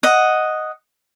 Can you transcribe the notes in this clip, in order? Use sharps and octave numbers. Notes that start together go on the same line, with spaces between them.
D#5 F#5